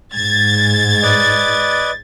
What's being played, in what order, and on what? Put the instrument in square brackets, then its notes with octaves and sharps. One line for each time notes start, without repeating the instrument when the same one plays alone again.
[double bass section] G#2 [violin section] G#6 A6
[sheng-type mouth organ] B4 D5 D#5